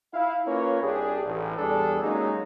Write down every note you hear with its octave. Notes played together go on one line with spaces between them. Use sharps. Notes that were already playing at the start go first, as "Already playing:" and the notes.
E4 F5
A#3 C#4 F4 B4 C#5
C2 D4 G4 G#4
A1
E2 G3 D4 G#4 A4
F#3 G#3 A#3 C#4 D#4